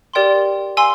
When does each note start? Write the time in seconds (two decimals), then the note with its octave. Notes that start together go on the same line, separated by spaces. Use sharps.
0.14 G4 A#4 D5 G5 C6
0.77 F5 G#5 C6 E6